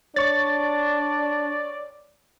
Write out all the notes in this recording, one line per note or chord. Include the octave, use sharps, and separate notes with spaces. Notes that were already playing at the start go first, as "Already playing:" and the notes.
D4 C#5 D5 C#6 A6